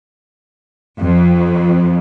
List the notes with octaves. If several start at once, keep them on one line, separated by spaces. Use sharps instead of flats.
F2